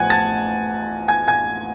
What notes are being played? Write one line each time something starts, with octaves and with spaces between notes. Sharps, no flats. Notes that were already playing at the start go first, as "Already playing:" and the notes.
Already playing: A1 A2 F3 F#5 G#5 F#6 G#6
A5 A6
G#5 G#6
G#5 G#6